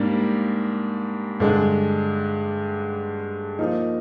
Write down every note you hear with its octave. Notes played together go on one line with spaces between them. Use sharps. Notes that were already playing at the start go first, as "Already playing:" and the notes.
Already playing: G#2 G3 A#3 D4
G2 D3 G#3 D4
F3 A#3 D#4